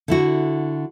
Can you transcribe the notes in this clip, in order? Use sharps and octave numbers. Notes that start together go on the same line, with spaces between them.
D3 E4 F#4